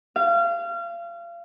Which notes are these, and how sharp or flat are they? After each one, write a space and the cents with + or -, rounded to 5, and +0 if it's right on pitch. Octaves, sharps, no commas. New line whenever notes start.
F5 -30